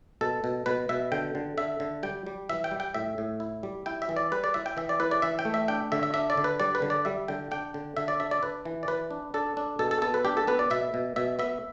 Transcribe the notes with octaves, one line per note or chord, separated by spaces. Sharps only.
B2 A4
B2
B2 B4
B2 E5
D3 G5
D3
D3 E5
D3
G3 G5
G3
E3 E5
G5
G3
G5
A2 E5
A2
E4
G3
E4 G5
E5
E3
D5
G3 B4
D5
E4 E5
G5
E3 E5
D5
E4 B4
D5
E3 E5
G5
A3
E5
D4 G5
D3 E5
E5
D4 E5
D5
D3
B4
G3 D5
B4
D3
D5
G3 E5
D3 G5
D4 G5
D3
D3 E5
D5
D4 E5
D5
D4 B4
E3
D5
E3 B4
D4
D4 A4
D4
B2 A4
A4
B3 A4
B4
D4 G4
A4
B3 B4
D5
B2 E5
B2
B2 E5
B3 E5